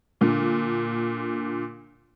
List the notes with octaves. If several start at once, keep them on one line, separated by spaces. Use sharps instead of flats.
A#2 D3